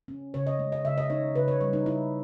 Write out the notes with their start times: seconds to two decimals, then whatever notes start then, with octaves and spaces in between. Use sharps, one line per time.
0.08 C#4
0.34 C#3 C#5
0.47 D#5
0.59 G#3
0.72 D#5
0.85 C#3 E5
0.98 D#5
1.10 D#4 C#5
1.35 C#3 B4
1.48 C#5
1.61 G3 C#5
1.73 D#4
1.86 D#4 E4